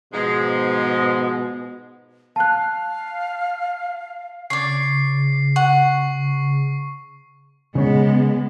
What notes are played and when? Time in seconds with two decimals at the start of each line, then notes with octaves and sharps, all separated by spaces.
0.13 G#2 B2 F3 G#3
2.36 F5 A5 F#6
4.50 C#3 C#5 D5 C7
5.56 F#5 C#6
7.75 C#3 G#3 B3 C#5